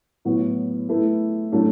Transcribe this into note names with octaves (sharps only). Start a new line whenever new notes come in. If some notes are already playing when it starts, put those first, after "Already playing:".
A2 F#3 B3 F#4
A3 E4 B4
A2 F#3 A3 D4